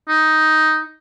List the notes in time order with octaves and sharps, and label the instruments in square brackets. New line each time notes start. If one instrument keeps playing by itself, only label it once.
[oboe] D#4